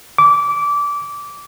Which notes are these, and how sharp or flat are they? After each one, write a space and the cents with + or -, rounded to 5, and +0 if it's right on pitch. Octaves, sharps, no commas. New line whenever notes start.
D6 -20